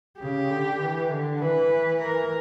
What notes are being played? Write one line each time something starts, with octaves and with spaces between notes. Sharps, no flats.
C#3 G4
D3
E3
D3
E3 B4
A#4